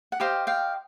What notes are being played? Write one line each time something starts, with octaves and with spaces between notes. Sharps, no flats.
F#5
G4 C5 D#5 F5 G5
F5 G5